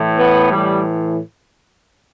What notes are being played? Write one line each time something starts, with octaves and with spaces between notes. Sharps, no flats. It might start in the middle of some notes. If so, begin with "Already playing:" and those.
Already playing: A2 E3
B3
A2 E3 G3